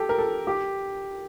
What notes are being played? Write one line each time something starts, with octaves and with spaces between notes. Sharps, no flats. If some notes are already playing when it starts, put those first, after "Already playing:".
Already playing: G4 A4
A#4
A4
G4